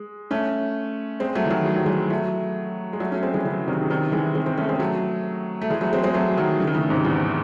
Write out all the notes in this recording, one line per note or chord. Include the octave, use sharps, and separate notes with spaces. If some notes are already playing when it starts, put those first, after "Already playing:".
Already playing: G#3
A3 C#4
G#3 C4
F#3 A3
E3
D#3 F#3
G#3
F#3
E3 G#3
F#3 A3
G#3
F#3 A3
A3 C#4
G#3 C4
E3 G#3
C#3 E3
C3 D#3
C#3
C3 D#3
E3 G#3
G#3 C4
G#3 C4
A3 C#4
G#3 C4
F#3 A3
A3
E3 G#3
F#3 A3
G#3 C4
G#3 C4
F#3 A3
D#3 F#3
C#3 E3
D#3
A2 C#3
G#2 C3
E2